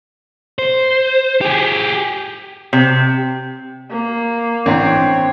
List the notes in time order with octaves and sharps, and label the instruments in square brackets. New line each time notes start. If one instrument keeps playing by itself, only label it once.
[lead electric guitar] C5
G4 G#4
[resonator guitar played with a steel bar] C3
[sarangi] A#3
[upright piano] A1 D4 C7 [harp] C4 [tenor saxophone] C#5